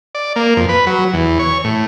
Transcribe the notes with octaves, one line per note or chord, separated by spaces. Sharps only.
D5
A#3
F2
B4
F#3
E2
C#5
A2